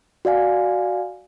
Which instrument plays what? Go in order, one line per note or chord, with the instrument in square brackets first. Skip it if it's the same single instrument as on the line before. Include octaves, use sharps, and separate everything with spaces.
[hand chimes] F#4 D5 F5 G#5